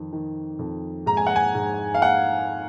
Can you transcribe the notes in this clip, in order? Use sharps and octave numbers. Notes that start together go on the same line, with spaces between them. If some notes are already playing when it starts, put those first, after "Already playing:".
Already playing: F2 D#3
D#3
F2
G#2 A#5
G#5
F#5
G#5
G#2
F5
F#5